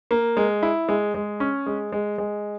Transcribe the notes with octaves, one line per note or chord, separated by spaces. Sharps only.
A#3
G#3
E4
G#3
G#3
C#4
G#3
G#3
G#3